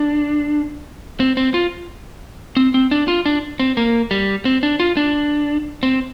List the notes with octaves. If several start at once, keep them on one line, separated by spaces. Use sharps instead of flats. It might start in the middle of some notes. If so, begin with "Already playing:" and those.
Already playing: D4
C4
C4
F4
C4
C4
D4
F4
D4
C4
A#3
G3
C4
D4
F4
D4
C4